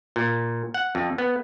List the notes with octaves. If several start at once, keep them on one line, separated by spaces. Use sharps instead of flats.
A#2
F#5
F2
B3